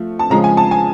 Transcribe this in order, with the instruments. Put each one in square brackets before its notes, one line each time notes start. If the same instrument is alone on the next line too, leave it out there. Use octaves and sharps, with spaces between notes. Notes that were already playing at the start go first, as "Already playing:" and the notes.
Already playing: [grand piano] F3 A3
A5
C#3 F3 G#3 A#5
G#5
A5
G#5